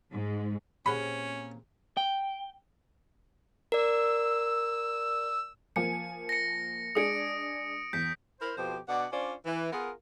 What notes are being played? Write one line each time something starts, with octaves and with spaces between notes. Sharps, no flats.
G#2
A#2 C4 C#4 G4 G#4 F#5 B5
G5
A#4 D5 E6
F3 A#3 G#5 C#7
A#6 C#7
G#3 D4 G#4 D#6 C#7 D7
E2 G6 B6
E4 A#4 C5
F2 B2 F3 G4 C5
B2 D4 D5 F#5
C#4 D4 F4 C5 D5
E3
B3 F4 G#4 A#4